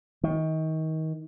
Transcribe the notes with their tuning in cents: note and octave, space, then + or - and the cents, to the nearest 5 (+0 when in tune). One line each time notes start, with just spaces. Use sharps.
D#3 +30